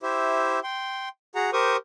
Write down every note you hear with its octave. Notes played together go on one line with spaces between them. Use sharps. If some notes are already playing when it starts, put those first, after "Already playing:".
E4 G4 C5 E5
G5 C6
F#4 G#4 F#5 A#5
G4 A#4 C5 C#6 D#6